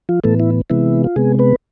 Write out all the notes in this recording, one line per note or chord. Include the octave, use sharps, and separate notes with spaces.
F3 F4
A2 E3 A3 B3 A4
E4
C3 E3 G#3 B3 E4
F4
C3 G#3 B3 G#4
B3 B4